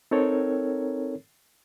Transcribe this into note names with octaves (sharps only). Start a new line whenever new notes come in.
C4 D#4 A4 A#4 C#5